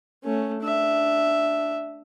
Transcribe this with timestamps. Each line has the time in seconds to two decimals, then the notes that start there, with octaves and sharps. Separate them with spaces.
0.24 A3 C#4
0.62 D4 E5